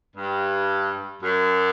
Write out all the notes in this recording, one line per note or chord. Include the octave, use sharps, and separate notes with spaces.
G2
F#2